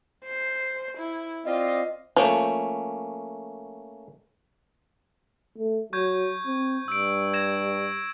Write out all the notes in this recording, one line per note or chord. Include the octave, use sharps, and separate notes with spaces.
C5
E4
C4 F4 D5 D#5
F3 A3 A#3 C#4
A3
F#3 C#6 G6 G#6
C4
G2 E6 D7
G#6 A#6 E7